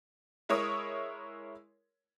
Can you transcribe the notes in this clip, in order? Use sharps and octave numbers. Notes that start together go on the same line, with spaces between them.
G#3 E4 A#4 C#5 D#6